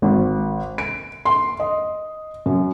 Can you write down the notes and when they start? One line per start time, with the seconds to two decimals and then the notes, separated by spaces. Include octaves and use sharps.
0.02 G#1
0.78 D7
1.25 C6
1.60 D#5
2.46 F#2